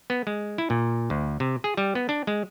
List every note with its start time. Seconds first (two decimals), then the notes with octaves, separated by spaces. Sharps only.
0.10 B3
0.27 G#3
0.58 E4
0.70 A#2
1.10 D2
1.40 C3
1.64 G#4
1.77 G3
1.95 B3
2.09 D4
2.27 G#3